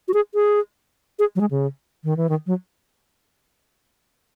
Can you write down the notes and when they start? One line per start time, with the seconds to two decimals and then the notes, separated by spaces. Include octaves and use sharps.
0.08 F#4
0.14 G#4
0.34 G#4
1.19 G#4
1.36 F#3
1.41 G#3
1.51 C#3
2.04 D#3
2.17 E3
2.29 D#3
2.47 F#3